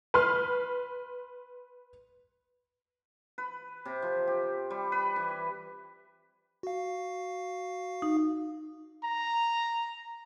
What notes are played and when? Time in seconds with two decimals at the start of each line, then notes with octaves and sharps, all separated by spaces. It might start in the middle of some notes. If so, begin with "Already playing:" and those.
0.14 B4 C6 F6
3.38 B4
3.85 C3
4.02 F3
4.27 G4
4.71 G3
4.92 B4
5.16 E3
6.63 F#4 F5
8.02 D#4
9.04 A#5